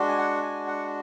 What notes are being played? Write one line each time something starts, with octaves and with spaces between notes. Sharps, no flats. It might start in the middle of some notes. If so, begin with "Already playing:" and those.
Already playing: G#3 D4 F#4
G#5
F#5
G#5
F#5